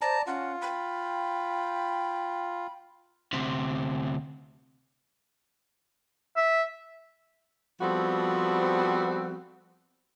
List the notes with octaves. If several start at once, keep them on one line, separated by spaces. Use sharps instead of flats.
C5 D5 A5 A#5
C#4 F4 F#5
G5 B5
D2 C3
E5
F3 G3 B3 C4 F#4 A4